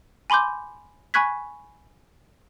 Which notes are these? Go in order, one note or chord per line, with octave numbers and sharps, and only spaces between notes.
G#5 B5 C6 D6 G6
G#5 B5 C#6 F#6 G#6 B6